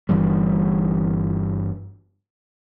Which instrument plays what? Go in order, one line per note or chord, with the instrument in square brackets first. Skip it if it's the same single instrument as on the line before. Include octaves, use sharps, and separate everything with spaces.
[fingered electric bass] G1 G2 E3 G3